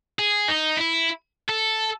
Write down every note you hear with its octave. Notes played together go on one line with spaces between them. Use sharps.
G#4
D#4
E4
A4